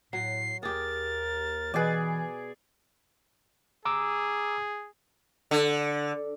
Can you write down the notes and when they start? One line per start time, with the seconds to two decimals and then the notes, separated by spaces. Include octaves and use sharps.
0.13 A2 F#3 C7
0.63 D#2 G4 G#4 A#4 A6
1.74 B2 E3 G#4 B4 D5
3.85 G#4 A#5 D6 E6
5.51 D3